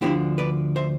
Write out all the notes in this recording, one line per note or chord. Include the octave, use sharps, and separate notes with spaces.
D2 D3 F3 B3 D4 E4 G4
B4 D5
C5 E5